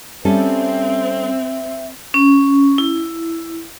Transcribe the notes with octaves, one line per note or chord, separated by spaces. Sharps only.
G3 C4 C#4 A4 E5
C#4
E4